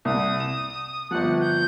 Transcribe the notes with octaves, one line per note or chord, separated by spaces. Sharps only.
C2 D#6
E7
G1 F3 F#5
G6